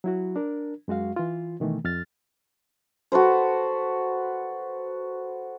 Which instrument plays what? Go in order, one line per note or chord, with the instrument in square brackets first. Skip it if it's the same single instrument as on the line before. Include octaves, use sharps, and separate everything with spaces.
[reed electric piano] F#3 E4 F#4
D4 A#4
F#2 G#3 F#4 F5
E3 F4
B2 D#3 E3 A3
F2 F6 A6
[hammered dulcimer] F#4 A4 B4 C5